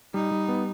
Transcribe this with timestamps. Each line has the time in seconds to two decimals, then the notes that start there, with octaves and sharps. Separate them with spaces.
0.14 G3 D#4
0.31 G3
0.49 B3